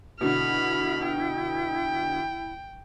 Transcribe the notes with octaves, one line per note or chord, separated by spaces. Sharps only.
B2 D3 E4 B5 F6
G5